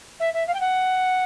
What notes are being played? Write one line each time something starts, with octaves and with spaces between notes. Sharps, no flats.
E5
E5
F5
G5
F#5